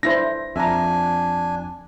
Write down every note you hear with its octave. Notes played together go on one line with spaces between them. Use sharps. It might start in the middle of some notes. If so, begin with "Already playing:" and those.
D4 E4 C5 A#6
F2 D4 E5 G#5 A#5